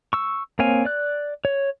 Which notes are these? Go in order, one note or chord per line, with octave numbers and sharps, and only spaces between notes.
C#6 E6
A#3 C4 C#5 F5 G#5
D5 F#6
C#5